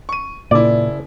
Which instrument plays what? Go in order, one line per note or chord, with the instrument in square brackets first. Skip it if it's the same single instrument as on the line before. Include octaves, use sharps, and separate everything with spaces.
[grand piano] C#6 D#7
[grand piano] F#1 E4 [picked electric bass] A#2 [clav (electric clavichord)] D5